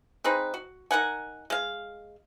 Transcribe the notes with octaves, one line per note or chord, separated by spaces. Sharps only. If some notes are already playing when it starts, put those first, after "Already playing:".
C4 D#4 G#4 B4
F#4
D#4 A#4 F#5 G#5
G#3 F5